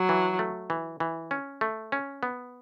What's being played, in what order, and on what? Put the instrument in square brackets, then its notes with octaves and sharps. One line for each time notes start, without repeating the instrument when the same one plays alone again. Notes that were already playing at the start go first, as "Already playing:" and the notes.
Already playing: [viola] F#3
[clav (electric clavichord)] E3
A3
E3
E3
C#4
A3
C#4
B3